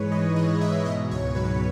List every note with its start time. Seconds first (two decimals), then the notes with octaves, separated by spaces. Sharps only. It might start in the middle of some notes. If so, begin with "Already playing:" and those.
Already playing: G#2 E3 G#3 B4 C#5
0.11 G#2 D#5
0.36 E3 D#5
0.60 G#2 E5
0.86 B2 D#5
1.11 C#2 C#5
1.35 F#3 B4